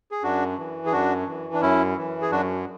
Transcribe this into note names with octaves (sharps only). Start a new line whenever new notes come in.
G#4
F#2 D4 F#4
E3
G#4
F#2 D4 F#4
E3
D4
F#2 C#4 E4
E3
G#4
F#2 D4 F#4